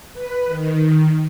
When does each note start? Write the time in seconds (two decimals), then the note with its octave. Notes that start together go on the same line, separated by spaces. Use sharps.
0.14 B4
0.47 D#3